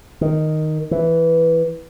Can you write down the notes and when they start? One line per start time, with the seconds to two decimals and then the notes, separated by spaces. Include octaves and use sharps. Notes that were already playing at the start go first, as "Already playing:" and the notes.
0.21 D#3
0.91 E3